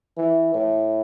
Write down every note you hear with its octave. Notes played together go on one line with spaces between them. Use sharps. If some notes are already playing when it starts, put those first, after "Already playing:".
E3
A2